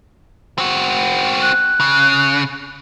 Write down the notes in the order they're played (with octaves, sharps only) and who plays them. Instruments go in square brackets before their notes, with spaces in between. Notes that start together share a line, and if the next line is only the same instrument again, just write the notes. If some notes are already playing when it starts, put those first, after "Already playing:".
[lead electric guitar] C4 F#4
[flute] F#6
[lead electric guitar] C#3